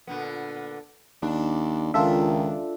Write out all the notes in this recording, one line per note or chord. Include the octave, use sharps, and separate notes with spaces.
A#2 D3 B3
D#2 D4
C#2 D#3 D4 F4 A4 E5